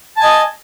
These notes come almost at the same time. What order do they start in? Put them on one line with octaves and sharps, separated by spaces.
A5 G#5 D#5